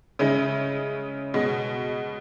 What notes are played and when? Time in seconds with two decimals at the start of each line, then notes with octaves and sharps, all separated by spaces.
0.19 C#3 G#3 C#4 E4
1.34 B2 G#3